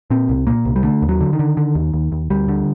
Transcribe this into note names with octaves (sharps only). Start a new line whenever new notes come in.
A#2 C4
C2
A#2 A#3
C2
G3
D3 A3
D#2
F#3
D3
D#3
D3
D3
D#2
D#2
D#2
D2 G3
D3